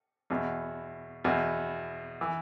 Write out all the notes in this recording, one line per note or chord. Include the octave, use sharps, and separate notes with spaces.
E2 B2
E2 B2
E3